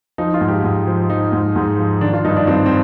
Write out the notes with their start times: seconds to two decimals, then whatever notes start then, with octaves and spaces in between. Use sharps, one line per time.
0.18 F3 D#4
0.34 F4
0.41 G#2
0.48 G4
0.64 G#2
0.87 F3
1.09 F3 D#4
1.32 G#2
1.56 G#2
1.79 F3
2.01 D#3 D4
2.13 F4
2.25 G2 D#4
2.37 D4
2.47 G2 C4
2.66 C4